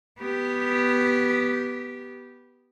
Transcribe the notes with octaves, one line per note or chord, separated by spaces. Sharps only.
B3 G4